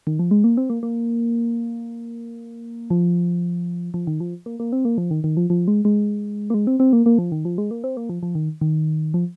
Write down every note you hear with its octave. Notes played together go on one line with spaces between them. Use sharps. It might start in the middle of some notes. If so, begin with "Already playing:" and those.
D#3
F3
G#3
A#3
C4
A#3
A#3
F3
F3
D#3
F3
A#3
A#3
C4
A#3
F3
D#3
D#3
F3
F3
G#3
G#3
A#3
G#3
C4
C4
A#3
A#3
F3
D#3
F3
G#3
A#3
C4
A#3
F3
F3
D#3
D#3
F3